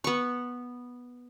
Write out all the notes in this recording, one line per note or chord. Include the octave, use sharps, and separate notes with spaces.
B3 C#6